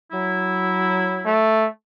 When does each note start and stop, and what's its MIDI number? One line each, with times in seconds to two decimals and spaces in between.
0.12 1.46 54
0.12 1.46 64
1.26 1.68 57